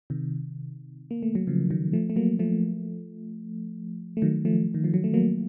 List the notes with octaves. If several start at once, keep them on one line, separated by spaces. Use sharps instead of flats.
C3 D#3
A#3
A3
F#3
C#3 F3
D#3 F#3
F3 A3
A3
F#3 A#3
F3 A3
A3
D#3 F#3
F3 A3
D#3
F3
F#3
A3
F#3 A#3